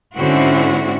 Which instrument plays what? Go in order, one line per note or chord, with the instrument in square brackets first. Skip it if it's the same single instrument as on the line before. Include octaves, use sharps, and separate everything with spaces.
[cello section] G#2 D3 C4 C#4 E4 F#4